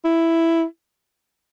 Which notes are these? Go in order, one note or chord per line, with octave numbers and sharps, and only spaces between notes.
E4